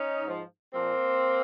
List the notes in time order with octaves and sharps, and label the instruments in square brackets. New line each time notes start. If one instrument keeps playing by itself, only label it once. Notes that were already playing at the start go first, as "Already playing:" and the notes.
Already playing: [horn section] C#4 D#4
G#2 F3
A#2 F3 A#3 C4